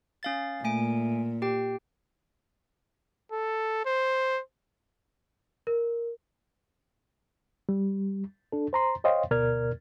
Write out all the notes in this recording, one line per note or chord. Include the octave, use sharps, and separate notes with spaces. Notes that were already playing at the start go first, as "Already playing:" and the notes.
C#4 F5 A6
A#2 A3 G#5 D7
G4 G5
A4
C5
A#4
G3
D4 A4
C5 A#5 C6
C5 C#5 D#5 F5 G5 C6
D2 B2 A#4 D5 F6 G#6